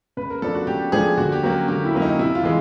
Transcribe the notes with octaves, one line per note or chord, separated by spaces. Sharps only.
C#3 B4
A#4
F3 A3 D4 A4
F#4
C#3 G4
F3 A3 D4 G#4
D3 F#4
G4
F#3 A#3 C#4 F#4
D3 G4
E4
F#3 A#3 C#4
D#4
C3 E4
F4
E3 G#3